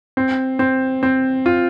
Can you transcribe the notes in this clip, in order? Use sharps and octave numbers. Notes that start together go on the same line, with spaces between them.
C4
C4
C4
F4